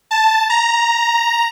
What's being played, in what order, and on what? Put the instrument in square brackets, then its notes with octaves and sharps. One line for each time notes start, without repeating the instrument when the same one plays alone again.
[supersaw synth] A5
A#5